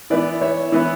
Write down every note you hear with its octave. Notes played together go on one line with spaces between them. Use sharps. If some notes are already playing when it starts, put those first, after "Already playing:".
E3 B3 E4 B4 D5
C#5 E5
E3 B3 E4